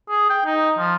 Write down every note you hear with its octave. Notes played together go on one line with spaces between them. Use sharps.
G#4
G5
D#4
F3